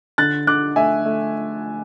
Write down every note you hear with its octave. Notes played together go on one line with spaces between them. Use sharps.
D3 F#6 A6
D3 D6 F#6
A3 E5 G#5
A3